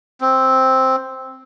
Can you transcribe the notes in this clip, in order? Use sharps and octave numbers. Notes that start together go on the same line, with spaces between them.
C4